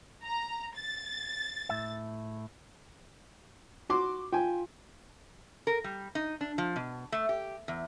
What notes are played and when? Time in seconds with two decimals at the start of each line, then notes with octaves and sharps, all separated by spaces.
0.24 A#5
0.75 A6
1.69 A2 E5
3.89 F#4 C6 D6
4.33 F4 G5 G#5
5.67 A#4
5.84 G3
6.15 D#4
6.41 D4
6.58 F3
6.76 B2
7.12 A3
7.29 G4
7.68 E2